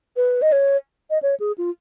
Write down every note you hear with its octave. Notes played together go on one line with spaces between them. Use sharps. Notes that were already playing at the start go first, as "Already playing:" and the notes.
B4
D#5
C#5
D#5
C#5
G#4
F4